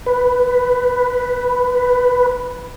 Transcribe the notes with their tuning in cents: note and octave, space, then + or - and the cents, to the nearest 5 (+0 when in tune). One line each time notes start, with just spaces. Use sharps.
B4 +5